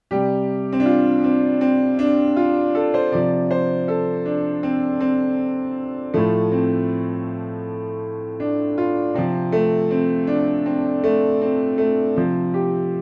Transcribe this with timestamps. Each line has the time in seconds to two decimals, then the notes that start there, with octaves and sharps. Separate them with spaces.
0.11 C3 G3 G4
0.73 C4
0.80 D4
0.86 F4
1.24 C4
1.61 C4
1.99 D4
2.36 F4
2.75 A4
2.94 C5
3.12 C3 F3 D5
3.51 C5
3.88 A4
4.26 D4
4.63 C4
5.00 C4
6.14 A2 F3 A3
6.52 C4
8.40 D4
8.78 F4
9.14 C3 F3 C4
9.52 A3
9.91 C4
10.27 D4
10.66 C4
11.04 A3
11.42 C4
11.78 A3
12.16 C3 F3 C4
12.54 G4